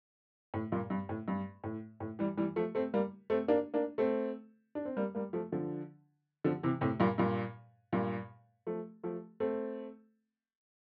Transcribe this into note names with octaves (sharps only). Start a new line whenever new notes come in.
A2
G2 A#2
G2
A2
G2
A2
A2
E3 G3
E3 G3
F3 A3
A3 C4
G3 A#3
A3 C4
A#3 D4
A#3 D4
A3 C4
D4
C4
G3 A#3
G3 A#3
F3 A3
D3 F3
D3 F3
C3 E3
A2 C3
G2 A#2
G2 A#2
G2 A#2
F3 A3
F3 A3
A3 C4